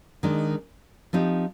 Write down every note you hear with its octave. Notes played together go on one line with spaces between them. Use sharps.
D#3 G#3 D4
F3 C4 D#4 G4